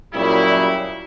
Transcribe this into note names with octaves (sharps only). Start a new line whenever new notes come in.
F#2 A#2 C#3 F#3 G3 E4